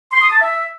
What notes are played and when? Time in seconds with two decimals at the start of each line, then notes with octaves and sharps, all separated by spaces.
0.12 C6
0.21 D#6
0.31 A5
0.40 E5